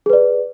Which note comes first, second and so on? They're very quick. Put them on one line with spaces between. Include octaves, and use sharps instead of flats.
G#4 B4 D5